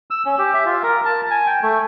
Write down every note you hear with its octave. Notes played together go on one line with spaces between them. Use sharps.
E6
C#4
G4
E5
F4
A#4
A5
G#5
G5
A3